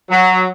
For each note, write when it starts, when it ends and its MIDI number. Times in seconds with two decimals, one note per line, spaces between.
0.11 0.46 54